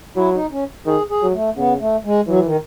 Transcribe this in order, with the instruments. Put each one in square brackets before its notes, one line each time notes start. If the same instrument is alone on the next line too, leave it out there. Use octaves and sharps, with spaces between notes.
[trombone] F#3 [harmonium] E4
[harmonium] D#4
C#4
[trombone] D#3 [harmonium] G#4
[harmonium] G#4
[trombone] F#3
[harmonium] A3
[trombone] C#3 [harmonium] B3
[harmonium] A3
G#3
[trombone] E3 [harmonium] F#3
[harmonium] D#3